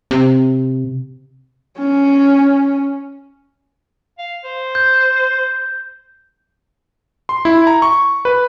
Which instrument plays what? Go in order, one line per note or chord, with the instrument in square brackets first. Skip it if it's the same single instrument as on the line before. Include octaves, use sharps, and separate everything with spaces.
[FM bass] C3
[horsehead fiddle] C#4
[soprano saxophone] F5
C5
[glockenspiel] G6
[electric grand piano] C6
E4
A#5
C#6
B4